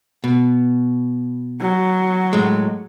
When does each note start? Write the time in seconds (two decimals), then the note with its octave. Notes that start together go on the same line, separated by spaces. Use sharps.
0.24 B2
1.61 F#3
2.33 A2 G#3